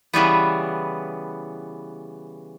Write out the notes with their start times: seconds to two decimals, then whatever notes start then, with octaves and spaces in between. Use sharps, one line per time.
0.14 C#3 E3 G3 B3